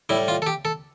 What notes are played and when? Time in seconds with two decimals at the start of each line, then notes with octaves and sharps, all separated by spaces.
0.09 A2 G3 E4
0.28 F4
0.42 A4
0.47 G4
0.65 A4